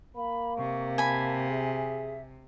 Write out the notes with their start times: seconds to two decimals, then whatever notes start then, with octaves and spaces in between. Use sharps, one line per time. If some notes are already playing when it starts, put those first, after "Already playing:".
0.16 A#3 B5
0.58 C3 C#6
0.98 G#5 A5 B5
1.50 G#4 E5